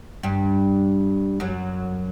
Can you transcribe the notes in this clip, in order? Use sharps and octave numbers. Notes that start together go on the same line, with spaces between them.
G2 G3
F#2 F#3